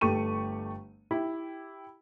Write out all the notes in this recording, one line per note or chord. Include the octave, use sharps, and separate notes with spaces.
G1 A3 G4 C#6 D#7
E4 G4